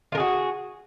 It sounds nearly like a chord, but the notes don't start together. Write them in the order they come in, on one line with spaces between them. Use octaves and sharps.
F4 A#4 G#4 F#4